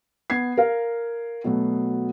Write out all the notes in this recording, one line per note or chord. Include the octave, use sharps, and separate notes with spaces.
B3 G#6 C7
A#4 F5
B2 F#3 A3 B3